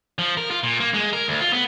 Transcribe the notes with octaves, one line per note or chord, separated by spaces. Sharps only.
F3
A#4
F4
A#2
A#3
G#3
A#4
D2
F4
B3